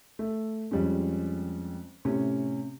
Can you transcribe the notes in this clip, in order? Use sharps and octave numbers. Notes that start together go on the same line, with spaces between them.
A3
F2 G3 G#3 C#4
A2 C3 C#4